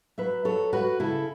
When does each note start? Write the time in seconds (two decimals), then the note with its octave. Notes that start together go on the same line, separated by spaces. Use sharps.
0.18 F#3 B4 E5
0.45 F#3 A4 C#5
0.72 F#2 F#4 B4
1.00 C#3 E4 A4